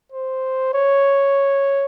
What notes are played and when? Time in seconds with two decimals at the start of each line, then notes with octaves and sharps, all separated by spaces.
0.12 C5
0.74 C#5